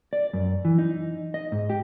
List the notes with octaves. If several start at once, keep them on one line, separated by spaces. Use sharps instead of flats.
D5
F#2
E3
D#4
D#5
G#2
G4